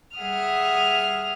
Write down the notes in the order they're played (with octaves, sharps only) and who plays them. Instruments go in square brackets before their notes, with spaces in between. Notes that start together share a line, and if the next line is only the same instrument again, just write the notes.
[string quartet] G3 G#4 E5 F#5 D#6 F6